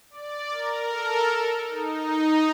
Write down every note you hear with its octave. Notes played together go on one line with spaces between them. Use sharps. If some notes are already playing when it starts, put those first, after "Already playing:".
D5
A#4
A4
D#4
D#4